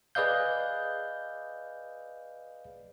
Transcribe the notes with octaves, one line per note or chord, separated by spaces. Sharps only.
G#4 B4 D5 D#5 F5 G6